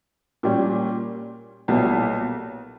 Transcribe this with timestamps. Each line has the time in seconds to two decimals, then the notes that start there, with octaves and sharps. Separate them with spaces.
0.43 A#2 G3 C#4
1.68 B1 A#2 G3 B3 E4